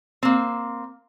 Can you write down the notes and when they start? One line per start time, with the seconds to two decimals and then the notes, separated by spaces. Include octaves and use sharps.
0.23 A#3 C4